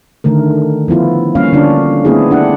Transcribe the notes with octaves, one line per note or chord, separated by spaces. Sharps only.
D3 D#3 A3 A#4
F3 B3 E4 F4
G3 A#3 C#4 F5
D3 C#4 D4 F4
A3 B3 C4 D4 E4 G#4
D4 E4 F#5